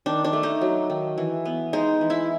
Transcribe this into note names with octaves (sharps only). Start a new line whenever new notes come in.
D#3 D4
D4
A3
D#4
F#3
D#3
E3
B3
G#3 D#4
E3
E4